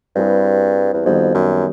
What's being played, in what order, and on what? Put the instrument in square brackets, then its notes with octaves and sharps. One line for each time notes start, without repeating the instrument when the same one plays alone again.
[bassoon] G2 [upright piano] G3 C4 E4 G#4 B4
[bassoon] E2
[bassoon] F2 [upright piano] D#3 G3 B3 D#4 F#4
[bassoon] F#2